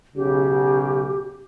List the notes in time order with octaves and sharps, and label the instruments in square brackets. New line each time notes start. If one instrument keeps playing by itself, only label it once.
[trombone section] B1 C#3 [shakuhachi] G4